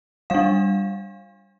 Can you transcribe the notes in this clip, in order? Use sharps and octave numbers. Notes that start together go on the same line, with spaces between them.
G3 D4 F5